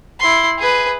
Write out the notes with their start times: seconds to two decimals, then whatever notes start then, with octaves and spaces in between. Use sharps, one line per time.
0.20 E4 C6
0.59 G#4 B4